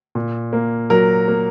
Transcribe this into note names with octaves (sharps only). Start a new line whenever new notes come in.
A#2
A#3
F#3 A#4
A#3